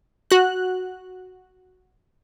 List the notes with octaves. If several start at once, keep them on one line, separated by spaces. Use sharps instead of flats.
F#4 F#6